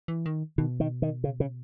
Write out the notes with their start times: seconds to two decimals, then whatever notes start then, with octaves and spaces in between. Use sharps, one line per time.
0.08 E3
0.26 D#3
0.58 B2 D#3
0.80 D#3
1.02 D#3
1.24 C#3
1.40 C#3